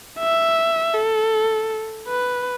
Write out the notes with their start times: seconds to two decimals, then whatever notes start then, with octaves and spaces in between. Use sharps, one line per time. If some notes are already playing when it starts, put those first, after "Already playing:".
0.20 E5
0.94 A4
2.08 B4